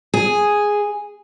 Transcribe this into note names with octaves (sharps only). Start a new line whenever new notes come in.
G#4